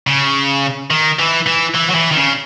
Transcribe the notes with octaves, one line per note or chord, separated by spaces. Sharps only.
C#3
D#3
E3
E3
E3
F#3
E3
D#3
C#3